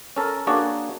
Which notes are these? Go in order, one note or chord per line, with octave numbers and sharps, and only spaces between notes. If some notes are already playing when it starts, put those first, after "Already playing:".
C#4 A4 A#4
A#3 D4 F#4 G#4 C#5 D5